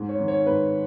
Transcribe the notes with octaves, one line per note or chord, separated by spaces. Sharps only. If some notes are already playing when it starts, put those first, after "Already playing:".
Already playing: G#2
C#5
D#3
C#5
G#2 B4